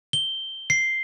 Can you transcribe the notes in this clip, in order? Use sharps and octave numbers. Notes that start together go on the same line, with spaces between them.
G7
C7